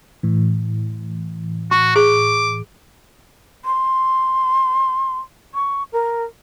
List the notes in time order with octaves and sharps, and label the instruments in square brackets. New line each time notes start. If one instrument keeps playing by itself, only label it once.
[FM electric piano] A2 E3
[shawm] F#4 [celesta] C#6
[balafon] G#4 [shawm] D6
[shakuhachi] C6
C#6
A#4